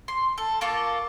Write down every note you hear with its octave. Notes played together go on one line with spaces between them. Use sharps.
C6
A4
A#3 F4 A4 C#6